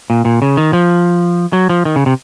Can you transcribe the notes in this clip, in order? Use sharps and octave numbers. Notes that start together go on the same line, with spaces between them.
A#2
A#2
C#3
D#3
F3
F#3
F3
D#3
C#3
C3